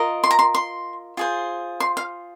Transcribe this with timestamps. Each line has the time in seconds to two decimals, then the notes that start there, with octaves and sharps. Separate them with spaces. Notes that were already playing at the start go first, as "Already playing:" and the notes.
Already playing: F4 A#4 D#5
0.24 C6
0.31 A#5
0.39 C6
0.55 C6
1.17 F4 G#4 C5
1.80 C6
1.97 F5